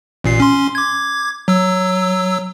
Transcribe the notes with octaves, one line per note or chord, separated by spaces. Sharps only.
A1 A#2 C7
C#4 C6
D6 G#6
F#3 E6